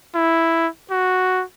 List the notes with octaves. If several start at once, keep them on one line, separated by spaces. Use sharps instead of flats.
E4
F#4